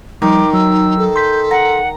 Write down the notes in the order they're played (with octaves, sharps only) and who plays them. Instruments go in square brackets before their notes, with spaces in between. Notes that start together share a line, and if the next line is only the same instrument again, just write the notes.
[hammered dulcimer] D#3 [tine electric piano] F3 G3 [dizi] D#4 [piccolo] D6
[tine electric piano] F#3 [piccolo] E6
[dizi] A4
[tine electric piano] C6 B6 [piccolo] G6
[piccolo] F#5 [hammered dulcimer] A#5